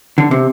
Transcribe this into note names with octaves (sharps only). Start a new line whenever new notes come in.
D3
C3